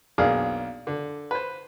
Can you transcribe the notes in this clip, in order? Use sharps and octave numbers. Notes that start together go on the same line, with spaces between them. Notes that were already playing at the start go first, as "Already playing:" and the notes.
B1 A#3 D4 G#4 F5 D#6
D3
B4 C5